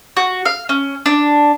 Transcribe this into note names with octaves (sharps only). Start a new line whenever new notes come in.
F#4
F5
C#4
D4